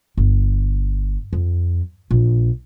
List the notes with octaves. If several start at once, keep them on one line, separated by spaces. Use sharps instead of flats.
G1
F2
A#1